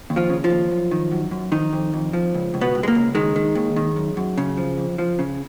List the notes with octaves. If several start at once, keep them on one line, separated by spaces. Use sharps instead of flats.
D#2
F3 F4
C#3
F3 F4
D#2
F#2
D#3
F#2
F#2
F2 D#3 D#4
F2
F2
F3
C#2
C#2
B2 B3
C#2
G#3
A#3
C#2
D#3 G#3
D#3
D#2
D#3
F#2
F#2
C#3
F3
F2
F3
C#3